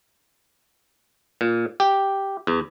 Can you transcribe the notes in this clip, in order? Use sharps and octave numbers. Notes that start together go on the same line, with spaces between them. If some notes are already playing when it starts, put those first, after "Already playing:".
A#2
G4
E2